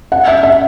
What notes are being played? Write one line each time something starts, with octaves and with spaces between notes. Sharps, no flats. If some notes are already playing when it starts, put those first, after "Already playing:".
F#5
E5
E5